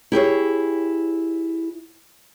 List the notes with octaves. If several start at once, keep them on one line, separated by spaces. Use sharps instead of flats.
E4 G4 G#4 C#5